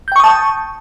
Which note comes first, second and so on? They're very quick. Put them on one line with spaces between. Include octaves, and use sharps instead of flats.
G6 G5 C#6 D#6 A5